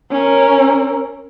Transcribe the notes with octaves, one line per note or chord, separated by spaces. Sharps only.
C#4 A#4